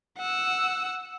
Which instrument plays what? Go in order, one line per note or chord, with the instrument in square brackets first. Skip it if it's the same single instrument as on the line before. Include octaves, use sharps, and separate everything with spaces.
[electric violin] F#5 E6